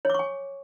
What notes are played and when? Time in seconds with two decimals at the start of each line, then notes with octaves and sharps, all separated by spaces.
0.05 C#5
0.10 D6
0.14 C#6
0.19 G#5